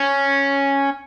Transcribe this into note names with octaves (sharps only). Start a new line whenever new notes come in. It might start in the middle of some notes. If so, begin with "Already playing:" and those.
Already playing: C#4